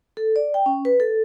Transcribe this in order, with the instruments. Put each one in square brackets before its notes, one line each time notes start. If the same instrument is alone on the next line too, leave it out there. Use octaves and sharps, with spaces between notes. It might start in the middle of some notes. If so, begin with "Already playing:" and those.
[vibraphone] A4
D5
G5
C#4
B4
A4